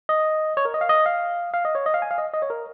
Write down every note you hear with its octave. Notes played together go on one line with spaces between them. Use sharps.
D#5
C#5
A#4
D#5
F5
D#5
F5
F5
D#5
C#5
D#5
F5
G#5
F5
D#5
D#5
C#5
A#4